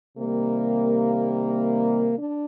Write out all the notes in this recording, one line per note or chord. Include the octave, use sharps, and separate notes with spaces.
C3 D#3 G3 A#3
D4